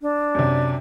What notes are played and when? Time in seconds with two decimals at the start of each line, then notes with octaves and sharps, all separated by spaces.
0.01 D4
0.35 F#2 C3